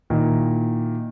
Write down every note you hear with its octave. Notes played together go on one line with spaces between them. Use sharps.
A#2 D#3 E4